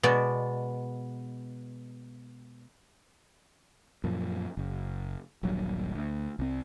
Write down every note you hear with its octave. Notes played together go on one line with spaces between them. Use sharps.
B2 G#3 B3 D5
F#2 A#2 F3
F#1
D#1 A#1 G2 F#3
D2
C2 C4